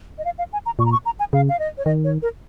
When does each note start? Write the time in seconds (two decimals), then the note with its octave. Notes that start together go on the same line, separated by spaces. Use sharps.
0.18 D#5
0.25 F5
0.38 F5
0.53 G#5
0.66 A#5
0.79 A#2 C#6
0.86 A#5
0.92 C#6
1.05 A#5
1.19 G#5
1.33 C#3 F5
1.49 F5
1.59 D#5
1.78 C#5
1.85 D#3 D#5
2.04 C#5
2.22 A#4